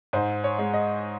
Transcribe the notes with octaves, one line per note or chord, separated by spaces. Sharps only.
G#2 C5
C#5
G#3
D#5